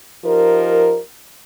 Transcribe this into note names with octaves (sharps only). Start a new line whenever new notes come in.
F3 D#4 G4 A#4